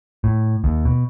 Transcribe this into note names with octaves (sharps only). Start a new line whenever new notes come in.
A2
D#2
B2